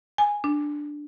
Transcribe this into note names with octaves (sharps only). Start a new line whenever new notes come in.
G#5
D4